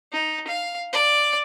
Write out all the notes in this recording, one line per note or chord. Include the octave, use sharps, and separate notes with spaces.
D#4
F5
D5